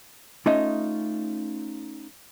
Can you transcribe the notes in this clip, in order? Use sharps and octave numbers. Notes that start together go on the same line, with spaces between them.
A3 C#4 D#4 F4 D#5 E5